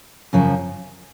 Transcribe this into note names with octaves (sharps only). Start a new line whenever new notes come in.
F#2 C#3 F3